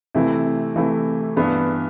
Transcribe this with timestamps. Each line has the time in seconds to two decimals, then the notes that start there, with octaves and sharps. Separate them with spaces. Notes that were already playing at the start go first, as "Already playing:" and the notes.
0.15 C3 E3 A3 E4
0.76 C3 E3 A3 E4
1.36 G2 E3 B3 D4